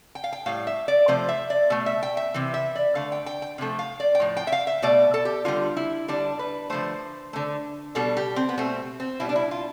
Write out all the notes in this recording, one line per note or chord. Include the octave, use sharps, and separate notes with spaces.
G5
F5
G5
A2 G3 F5
E5
D5
C3 F3 A3 C5
E5
D5
B2 A3
E5
G5
E5
C3 E3
E5
D5
D3 A3 F5
G5
G5
G5
C3 F3 A3
F5
D5
G5
A2 F3
G5
E5
F5
E5
B2 A3 D5
A4
G4
D3 G3 F4
E4
D3 G3 D4
B4
D3 F3 A3 C5
D3 A3
B2 G3 A4
G4
C4
B3
B2 A3 C4
C4
B2 G3 E4
D4
E4
F4